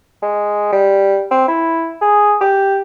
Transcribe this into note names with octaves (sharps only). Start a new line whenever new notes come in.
G#3
G3
C4
E4
G#4
G4